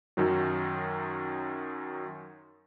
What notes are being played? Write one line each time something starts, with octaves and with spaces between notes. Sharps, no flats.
F#2 D#3 F#3